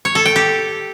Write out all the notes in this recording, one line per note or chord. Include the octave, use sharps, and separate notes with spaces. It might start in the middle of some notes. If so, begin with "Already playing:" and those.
C#5
A4
G5
G4